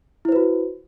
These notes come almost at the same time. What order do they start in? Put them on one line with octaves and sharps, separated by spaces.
E4 C5 B4 F#4